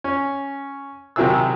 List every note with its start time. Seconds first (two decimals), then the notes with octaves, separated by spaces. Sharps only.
0.04 C#4
1.16 C3 D#3 F#3 E4 G#4 E6